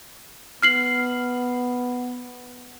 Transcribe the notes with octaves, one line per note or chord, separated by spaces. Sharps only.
B3 F6 C7 F#7